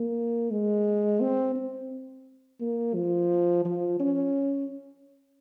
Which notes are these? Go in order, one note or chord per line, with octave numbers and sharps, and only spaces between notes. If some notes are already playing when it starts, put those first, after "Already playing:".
Already playing: A#3
G#3
C4
C4
A#3
F3
F3
C#4